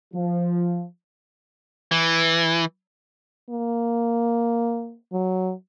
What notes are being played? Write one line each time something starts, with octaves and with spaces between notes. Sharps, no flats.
F3
E3
A#3
F#3